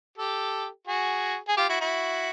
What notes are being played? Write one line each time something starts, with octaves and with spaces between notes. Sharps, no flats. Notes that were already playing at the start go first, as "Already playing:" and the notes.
G4 A4
F#4 G#4
G#4
F4 G4
E4 F#4
E4 F#4